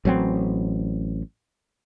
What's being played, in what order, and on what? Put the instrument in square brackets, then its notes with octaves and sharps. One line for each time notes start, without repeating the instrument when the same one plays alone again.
[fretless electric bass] A1 F#3 A#3 C4